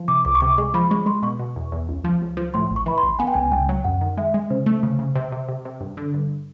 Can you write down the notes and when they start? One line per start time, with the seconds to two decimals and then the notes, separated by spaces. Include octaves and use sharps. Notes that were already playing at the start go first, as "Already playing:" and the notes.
Already playing: F3
0.08 C3 D6
0.25 C#2 D6
0.35 C#6
0.41 C3 D6
0.58 G#3 C#6
0.74 F3 B5
0.90 G#3 C#6
1.06 G#3 C6
1.23 B2 C#6
1.39 B2
1.56 E2
1.72 E2
1.89 C#2
2.04 F3
2.22 C#2
2.37 F3
2.54 A2 C6
2.70 A1
2.76 C#6
2.86 E3 B5
2.98 C6
3.03 A1
3.19 B3 G#5
3.27 G5
3.34 C#2 G#5
3.52 C#2 G5
3.69 F#3
3.84 F#2 F#5
4.01 D#3
4.17 G#3 E5
4.34 G#3
4.50 C#3 C5
4.66 A3
4.83 C#3
4.99 C#3
5.15 C3
5.32 C3
5.49 C3
5.65 C3
5.81 G2
5.97 D3
6.14 G2